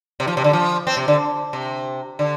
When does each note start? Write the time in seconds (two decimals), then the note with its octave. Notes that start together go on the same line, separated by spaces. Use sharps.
0.20 C3
0.27 F3
0.37 C3
0.44 D3
0.53 F3
0.87 C4
0.97 C3
1.08 D3
1.53 C3
2.19 D3